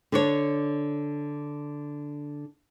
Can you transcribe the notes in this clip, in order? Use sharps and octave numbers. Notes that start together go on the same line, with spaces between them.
D3 D4 C#5